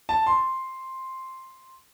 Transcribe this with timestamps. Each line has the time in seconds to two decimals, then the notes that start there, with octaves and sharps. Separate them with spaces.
0.09 A5
0.26 C6